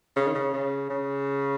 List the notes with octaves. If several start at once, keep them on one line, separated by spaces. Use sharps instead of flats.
C#3
D#3
C#3
C#3
C#3